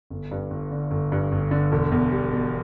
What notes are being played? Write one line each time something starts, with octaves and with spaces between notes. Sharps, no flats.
G1
G2
G1
D3
G1
G2
G1
D3
E1
E2
G3
B2